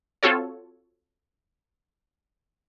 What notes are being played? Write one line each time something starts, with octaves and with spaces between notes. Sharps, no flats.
C4 F4 F#4 A4 C#5